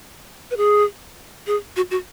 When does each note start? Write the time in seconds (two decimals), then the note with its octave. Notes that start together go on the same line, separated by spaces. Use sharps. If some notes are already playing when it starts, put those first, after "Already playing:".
0.51 B4
0.57 G#4
1.47 G#4
1.76 F#4
1.91 F#4